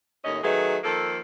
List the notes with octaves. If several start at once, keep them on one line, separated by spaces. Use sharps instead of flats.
D#2 A2 C#4 D#5
D#3 F#3 A3 D#4 G#4 B4
D#3 F3 A#3 A4